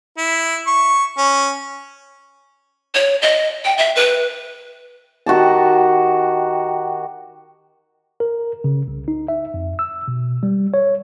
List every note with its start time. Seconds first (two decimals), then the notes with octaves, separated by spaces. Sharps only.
0.18 E4
0.67 C#6
1.18 C#4
2.95 C#5
3.22 D#5
3.64 G5
3.78 E5
3.96 B4
5.26 D#3 F#4 G4 A5
8.20 A#4
8.64 C#3
8.88 C2
9.08 D#4
9.28 E5
9.54 F2
9.79 E6
10.08 B2
10.43 G3
10.74 C#5